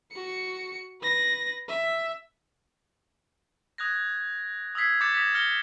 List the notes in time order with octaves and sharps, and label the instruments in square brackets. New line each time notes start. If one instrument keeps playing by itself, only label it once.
[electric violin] F#4 C#7
B4 A#6
E5
[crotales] D#6 F#6 G#6 A#6
D#6 E6 G#6 B6 C7
D6 G6 A6 C#7
D#6 G#6 A#6 B6
F6 A#6 C#7 G7